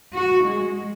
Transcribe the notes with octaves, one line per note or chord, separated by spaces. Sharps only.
F#4
G#3